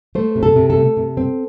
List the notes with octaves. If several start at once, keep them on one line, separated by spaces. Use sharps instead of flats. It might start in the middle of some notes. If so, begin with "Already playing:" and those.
A3 C5
C3
A4
C3
A4
A3
C3
C4